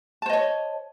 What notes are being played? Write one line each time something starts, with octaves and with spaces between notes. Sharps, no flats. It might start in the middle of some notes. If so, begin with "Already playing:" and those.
C5 C#5 D#5 A5